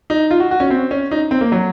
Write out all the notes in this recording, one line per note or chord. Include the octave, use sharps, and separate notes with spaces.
D#4
F4
F#4
F#4
C#4
C4
C#4
D#4
C4
A#3
F#3